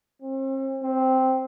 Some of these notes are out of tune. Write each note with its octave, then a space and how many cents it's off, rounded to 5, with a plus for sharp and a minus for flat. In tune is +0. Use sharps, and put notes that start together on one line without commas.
C4 +40
C4 -5